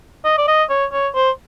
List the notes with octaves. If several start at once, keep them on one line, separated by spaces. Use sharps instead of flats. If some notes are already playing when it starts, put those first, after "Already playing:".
D#5
D5
D#5
C#5
C#5
C5